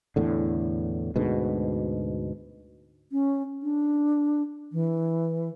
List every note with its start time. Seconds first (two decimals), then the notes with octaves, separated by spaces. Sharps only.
0.16 E2 A2 D3
1.16 D2 G#2 B2
3.12 C#4
3.63 D4
4.72 E3